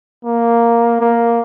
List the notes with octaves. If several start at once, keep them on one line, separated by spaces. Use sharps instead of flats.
A#3
A#3